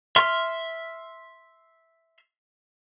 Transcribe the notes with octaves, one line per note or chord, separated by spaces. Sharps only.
E5 C6 F6